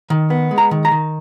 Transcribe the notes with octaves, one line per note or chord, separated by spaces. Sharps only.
D#3
B3
G#3
A#5
D#3
A#5
D#3